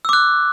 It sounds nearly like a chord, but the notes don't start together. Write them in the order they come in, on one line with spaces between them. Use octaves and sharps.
E6 D6 F#6